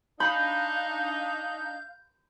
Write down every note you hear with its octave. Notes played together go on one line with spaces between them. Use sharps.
D4 D#4 F5 B5 G6